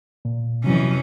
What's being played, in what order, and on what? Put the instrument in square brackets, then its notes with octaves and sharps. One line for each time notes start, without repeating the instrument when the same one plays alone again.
[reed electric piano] A#2
[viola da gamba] F2 E3 C#4 [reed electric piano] C3 F#3